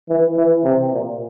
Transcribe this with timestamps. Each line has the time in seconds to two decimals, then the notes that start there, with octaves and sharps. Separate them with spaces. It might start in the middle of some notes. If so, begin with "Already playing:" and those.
0.09 E3
0.37 E3
0.64 C3
0.93 A#2